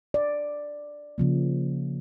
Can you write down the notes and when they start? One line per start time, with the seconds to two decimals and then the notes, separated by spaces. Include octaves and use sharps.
0.14 D5
1.18 C#3 F3 A#3